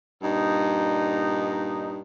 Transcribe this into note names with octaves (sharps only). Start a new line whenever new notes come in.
G2 A#2 D#4